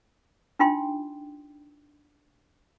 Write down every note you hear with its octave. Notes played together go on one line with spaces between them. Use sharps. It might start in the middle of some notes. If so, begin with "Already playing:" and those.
D4 D#4 F4 G5 C6